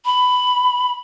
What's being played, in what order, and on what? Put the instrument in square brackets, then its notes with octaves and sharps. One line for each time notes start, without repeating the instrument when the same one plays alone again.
[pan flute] B5